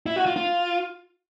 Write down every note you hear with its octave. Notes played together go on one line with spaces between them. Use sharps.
E4
F#4
F4
F4